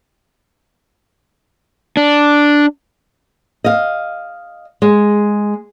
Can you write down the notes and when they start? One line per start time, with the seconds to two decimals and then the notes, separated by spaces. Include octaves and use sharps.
1.97 D4
3.64 D#5 F5
4.82 G#3